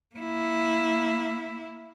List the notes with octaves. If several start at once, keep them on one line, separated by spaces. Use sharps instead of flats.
A#3 E4